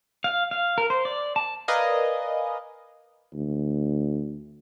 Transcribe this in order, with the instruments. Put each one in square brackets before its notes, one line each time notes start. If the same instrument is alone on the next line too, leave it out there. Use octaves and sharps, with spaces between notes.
[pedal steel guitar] F5
F5
A#4
C5
D5
A5
[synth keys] A#4 B4 D5 D#5 F5 G#5
[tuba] D2